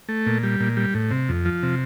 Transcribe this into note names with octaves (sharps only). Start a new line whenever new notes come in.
A3
A#2
G3
A#2
G3
A2
C3
F2
F3
C3